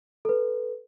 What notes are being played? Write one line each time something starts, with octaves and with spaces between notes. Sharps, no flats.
A4 B4